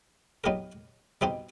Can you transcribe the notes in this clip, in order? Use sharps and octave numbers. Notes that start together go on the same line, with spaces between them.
F#3 B3 D#4 G4 A#4
B2 G3 C4 D#4 G4